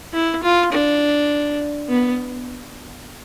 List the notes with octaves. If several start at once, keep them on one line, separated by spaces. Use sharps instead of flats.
E4
F4
D4
B3